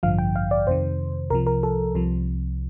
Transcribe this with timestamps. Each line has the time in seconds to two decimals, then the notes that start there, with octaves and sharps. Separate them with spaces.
0.03 A1 G2 D3 F3 F5
0.18 G5
0.36 F5
0.51 D5
0.67 F2 C3 D#3 C5
1.30 C2 C3 F3 A#4
1.47 A#4
1.63 A4
1.95 C2 C3 F3